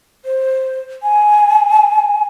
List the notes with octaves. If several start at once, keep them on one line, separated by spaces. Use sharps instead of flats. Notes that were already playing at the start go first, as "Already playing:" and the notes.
C5
G#5